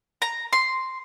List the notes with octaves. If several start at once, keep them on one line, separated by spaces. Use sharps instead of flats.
A#5
C6